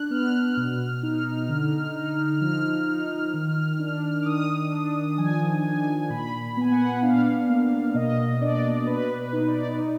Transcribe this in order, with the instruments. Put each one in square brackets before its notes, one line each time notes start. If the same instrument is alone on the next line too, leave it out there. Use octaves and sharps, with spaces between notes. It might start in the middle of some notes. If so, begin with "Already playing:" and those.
Already playing: [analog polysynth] D4 F#6
B3 F6
B2
D#4
D3
D#4
F3 F6
D#4
D#3
D4
D6
D#3 D#6
D4
F3 G#5
D4 G#5
A#2 B5
B3 G#5
F#5
D4 F5
A#3
B2 D#5
D4 D5
B2 B4
B4
D#4
D5
D#4